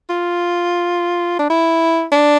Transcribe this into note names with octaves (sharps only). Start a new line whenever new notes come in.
F4
D4
E4
D4